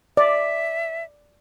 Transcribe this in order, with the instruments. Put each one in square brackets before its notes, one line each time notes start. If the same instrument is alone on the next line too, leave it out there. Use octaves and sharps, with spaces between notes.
[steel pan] D5 [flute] E5